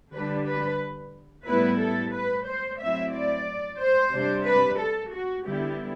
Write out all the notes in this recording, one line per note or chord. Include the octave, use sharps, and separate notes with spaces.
D3 G3 D4 B4
B4
A2 G3 B3 E4 B4
A4
B4
C5
A2 F#3 C4 E4 E5
D5
C5
C3 G3 D4
B4
A4
F#4
D3 G3 B3 E4 G4